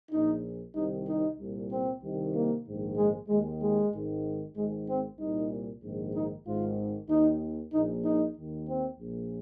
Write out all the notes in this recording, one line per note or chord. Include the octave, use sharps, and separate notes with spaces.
A#1 A#2 D#4
C2 C3 D#3 D#4
D#4
C2 A#2
C4
C2 C3 D#3
A#3
A#1 G#2 D#3
G#3
D#2 D#3 G#3
G#3
G#1 G#2 D#3
G#1 G#2 D#3 G#3
C4
C2 A#2 D#4
A#1 G#2 D#3
D#4
G#1 G#2 D#3 F4
D#2 D#3 D#4
A#1 A#2 D#4
D#4
D#2 D#3
C4
A#1 A#2